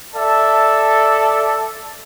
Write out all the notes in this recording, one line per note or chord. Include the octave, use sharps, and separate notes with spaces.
A4 D5 E5 A5